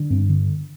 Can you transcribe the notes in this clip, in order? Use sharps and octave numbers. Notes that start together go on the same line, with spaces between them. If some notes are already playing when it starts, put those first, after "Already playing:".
Already playing: D3
G2 C4
D3